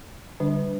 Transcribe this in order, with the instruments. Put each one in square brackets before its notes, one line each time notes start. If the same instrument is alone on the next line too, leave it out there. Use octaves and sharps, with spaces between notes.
[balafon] D3 G3 D4